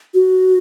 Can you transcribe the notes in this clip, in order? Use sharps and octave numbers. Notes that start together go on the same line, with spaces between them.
F#4